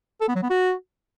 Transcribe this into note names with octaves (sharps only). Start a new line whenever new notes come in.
A4
B3
F#3
B3
F#4